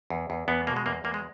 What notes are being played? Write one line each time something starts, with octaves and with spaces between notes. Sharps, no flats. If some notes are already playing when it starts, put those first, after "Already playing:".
E2
E2
E2 B3
B2 A#3
G#3
E2 A#3
E2 A#3
G#3